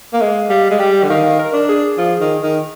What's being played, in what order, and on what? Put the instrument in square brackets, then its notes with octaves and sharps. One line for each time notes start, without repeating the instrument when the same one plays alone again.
[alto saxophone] A#3
[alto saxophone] G#3 [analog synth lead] F5
[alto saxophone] G3 [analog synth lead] F5
[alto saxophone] G#3
[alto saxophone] G3 [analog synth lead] G5
[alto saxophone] D3
[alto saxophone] D#3 [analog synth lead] F5
[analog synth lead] A#4
[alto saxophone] D4
[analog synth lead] G#4
[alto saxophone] F3
D#3
D#3